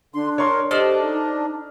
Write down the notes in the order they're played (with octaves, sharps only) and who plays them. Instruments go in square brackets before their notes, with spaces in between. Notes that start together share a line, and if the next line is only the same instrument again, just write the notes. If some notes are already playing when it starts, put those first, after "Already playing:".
[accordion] D3 C6 [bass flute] D4
[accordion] A#4 [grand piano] C#5 D5 C6
[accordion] D4 [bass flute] G4 [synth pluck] A4 C5 D5 [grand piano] D#5 F6
[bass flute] D#4